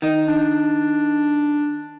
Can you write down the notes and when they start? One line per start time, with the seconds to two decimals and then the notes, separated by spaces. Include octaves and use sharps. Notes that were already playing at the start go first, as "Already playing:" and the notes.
0.02 D#3 D#4
0.27 D4